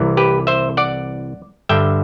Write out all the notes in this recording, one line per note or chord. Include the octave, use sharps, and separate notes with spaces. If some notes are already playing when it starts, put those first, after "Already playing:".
Already playing: C2 C3 E3
G4 B4
C5 E5
D5 F#5
G2 D3 E5 G5